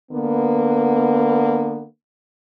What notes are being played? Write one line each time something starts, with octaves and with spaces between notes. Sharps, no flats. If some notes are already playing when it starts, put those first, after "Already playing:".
D3 A#3 B3